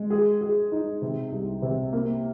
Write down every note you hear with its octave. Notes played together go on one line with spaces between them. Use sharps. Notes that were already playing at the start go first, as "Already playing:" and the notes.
Already playing: G#3
G#4
G#4
D#4
C3
C2
C3
A#3